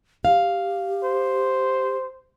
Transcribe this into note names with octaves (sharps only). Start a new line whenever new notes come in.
G4 F5
C5